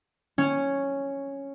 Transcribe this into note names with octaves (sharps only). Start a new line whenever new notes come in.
C#4